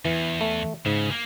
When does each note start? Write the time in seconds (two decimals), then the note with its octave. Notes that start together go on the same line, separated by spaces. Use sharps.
0.05 E2 E3
0.41 A3
0.86 G#2 C#3
1.11 A#3